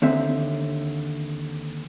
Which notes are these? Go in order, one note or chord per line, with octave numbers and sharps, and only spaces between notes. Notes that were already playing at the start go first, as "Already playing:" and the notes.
D#2 D3 C4 E5